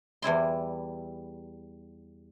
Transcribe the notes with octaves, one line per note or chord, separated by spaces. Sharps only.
E2 G3 E4 C6